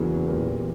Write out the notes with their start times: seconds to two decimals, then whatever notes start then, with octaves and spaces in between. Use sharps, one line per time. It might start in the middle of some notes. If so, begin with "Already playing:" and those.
Already playing: E2 C#3 F#3 A#3
0.27 A#2 G3 A#3